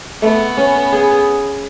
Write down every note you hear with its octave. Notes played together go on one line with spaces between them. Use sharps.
A3 B3
C#4
G#4